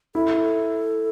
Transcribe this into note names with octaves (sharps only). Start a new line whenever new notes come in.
E4 A4